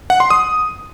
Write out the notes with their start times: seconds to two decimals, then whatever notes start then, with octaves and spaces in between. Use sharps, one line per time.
0.10 F#5
0.20 C6
0.30 D#6